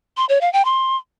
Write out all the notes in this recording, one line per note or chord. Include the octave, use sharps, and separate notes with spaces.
C6
C#5
F5
G5
C6